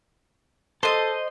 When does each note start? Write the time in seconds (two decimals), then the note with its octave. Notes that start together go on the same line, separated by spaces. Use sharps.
0.83 A4 C5 D#5